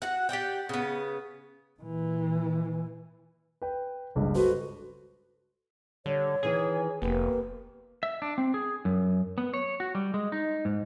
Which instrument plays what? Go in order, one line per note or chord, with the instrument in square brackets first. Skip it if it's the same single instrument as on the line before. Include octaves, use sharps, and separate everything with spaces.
[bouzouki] F#4 F#5
G4 D5 F#5 G5
C#3 B3
[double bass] A#2 E3
[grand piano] B4 G5
F#1 C#2 G2
[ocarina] F#4 [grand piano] A4 B4 C5
[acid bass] D3 [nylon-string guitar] G3 [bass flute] C#5
[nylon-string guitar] D#3 E3 [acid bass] G#4
[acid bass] F1 [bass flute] A#3 [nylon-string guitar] B3 G4 B4
[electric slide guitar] E5
D4
C4
G#4
F#2
B3
C#5
F#4
G3
G#3
D#4
G#2